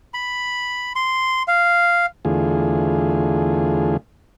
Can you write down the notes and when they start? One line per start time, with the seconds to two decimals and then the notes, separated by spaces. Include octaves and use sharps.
0.14 B5
0.96 C6
1.48 F5
2.25 E2 D3 A3 F4 G#4